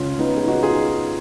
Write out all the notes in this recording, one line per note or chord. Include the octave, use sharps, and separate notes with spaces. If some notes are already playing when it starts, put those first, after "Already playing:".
Already playing: C#2 C#3 C#4 F4
B3 D#4
G#4
D#4 F#4
F4 G#4